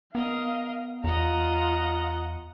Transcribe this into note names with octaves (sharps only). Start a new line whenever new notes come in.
B3 A#4 D#5 F5
E2 F4 D#5 F#5 A#5